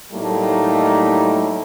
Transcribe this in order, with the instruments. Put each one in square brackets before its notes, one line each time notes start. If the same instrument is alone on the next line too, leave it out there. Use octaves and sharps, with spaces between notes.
[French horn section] A2 F#3 G3 A3 A#3 D#4